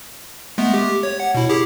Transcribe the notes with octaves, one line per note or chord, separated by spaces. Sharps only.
G#3 A3 B3
G4
C#5
F#5
B2 E4
E4 G4 G#4